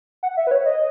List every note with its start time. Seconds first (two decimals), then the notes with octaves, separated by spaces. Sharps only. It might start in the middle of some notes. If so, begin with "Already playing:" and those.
0.23 F#5
0.37 E5
0.47 B4
0.51 C#5
0.66 D#5